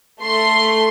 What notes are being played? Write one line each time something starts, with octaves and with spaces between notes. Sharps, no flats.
A3 C6